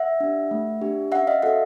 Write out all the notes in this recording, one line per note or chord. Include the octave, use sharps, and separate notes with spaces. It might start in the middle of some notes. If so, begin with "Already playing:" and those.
Already playing: E5 F#5
D4 G4
A3
D4 G4
C#4 E5 F#5
D#5 F5
F#4 A4 E5 F#5